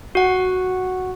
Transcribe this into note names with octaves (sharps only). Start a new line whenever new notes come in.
F#4 F#5